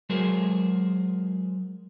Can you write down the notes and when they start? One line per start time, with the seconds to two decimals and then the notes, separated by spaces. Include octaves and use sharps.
0.10 F#3 G#3 G#4 A#4 C5